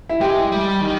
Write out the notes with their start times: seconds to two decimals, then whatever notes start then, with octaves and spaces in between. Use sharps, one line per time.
0.09 E4
0.21 G#3 G4
0.52 G3
0.81 D#3